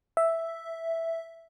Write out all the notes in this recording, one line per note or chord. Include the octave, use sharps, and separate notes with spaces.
E5